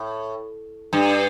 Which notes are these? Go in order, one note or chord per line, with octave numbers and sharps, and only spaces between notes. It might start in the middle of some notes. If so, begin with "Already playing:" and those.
Already playing: A2
G2